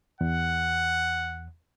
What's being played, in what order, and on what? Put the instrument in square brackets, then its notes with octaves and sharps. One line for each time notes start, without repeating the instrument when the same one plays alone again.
[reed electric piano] E2 [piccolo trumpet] F#5